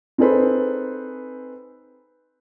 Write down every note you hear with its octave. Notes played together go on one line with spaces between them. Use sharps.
C4 D#4 G#4 A4 B4 C5